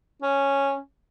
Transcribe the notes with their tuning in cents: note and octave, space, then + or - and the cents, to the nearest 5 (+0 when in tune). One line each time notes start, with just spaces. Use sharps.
C#4 -5